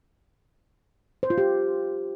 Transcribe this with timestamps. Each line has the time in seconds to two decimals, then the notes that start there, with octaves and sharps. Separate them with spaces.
1.23 C5
1.30 F4
1.38 G4